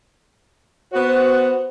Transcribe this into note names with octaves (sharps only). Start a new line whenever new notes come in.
B3 F#4 C5